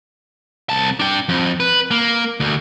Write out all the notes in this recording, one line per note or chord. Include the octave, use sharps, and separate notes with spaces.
C2 A5
D4 G5
F2
B4
A#3
D2